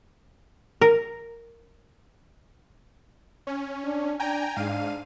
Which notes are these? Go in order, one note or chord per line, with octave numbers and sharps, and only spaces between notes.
A#4
C#4
D4
D4 G5 G#5 A#5
G#2 D4 F5 D#7